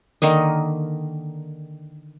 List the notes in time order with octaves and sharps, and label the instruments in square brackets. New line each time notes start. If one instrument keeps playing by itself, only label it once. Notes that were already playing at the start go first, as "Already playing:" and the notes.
[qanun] D3 D#3 A#3 D#5